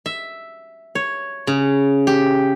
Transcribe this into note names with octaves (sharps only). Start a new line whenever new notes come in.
E5
C#5
C#3
G4